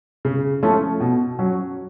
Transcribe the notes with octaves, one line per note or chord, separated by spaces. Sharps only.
C#3
F3 A3 C#4 F4
B2
F#3 C#4